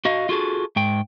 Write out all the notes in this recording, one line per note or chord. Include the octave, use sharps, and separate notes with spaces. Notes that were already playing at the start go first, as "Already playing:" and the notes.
F#4 D#5 F5
F4 F#4 G#4 A4
G#2 G5